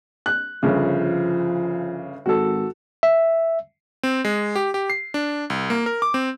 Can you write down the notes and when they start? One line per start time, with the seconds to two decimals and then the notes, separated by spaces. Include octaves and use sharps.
0.26 F#6
0.63 G1 C#3 F3
2.26 G#1 F#4 A4
3.03 E5
4.03 C4
4.25 G#3
4.56 G4
4.74 G4
4.90 C7
5.14 D4
5.50 C2
5.70 A#3
5.86 A#4
6.02 D6
6.14 C4